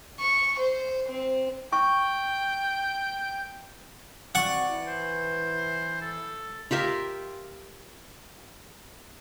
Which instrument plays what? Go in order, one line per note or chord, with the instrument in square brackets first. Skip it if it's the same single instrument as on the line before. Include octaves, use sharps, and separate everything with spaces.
[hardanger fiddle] C#6
C5
C4
[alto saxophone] G5 [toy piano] C#6
[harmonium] C4 F#4 [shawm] D5 [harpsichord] F#5 C#6
[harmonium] E3 E4
[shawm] C5
A4
[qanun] F4 G4 A#4 E5